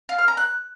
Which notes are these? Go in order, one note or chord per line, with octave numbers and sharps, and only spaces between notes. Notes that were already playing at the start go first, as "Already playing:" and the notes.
F5
F6
A#5
F#6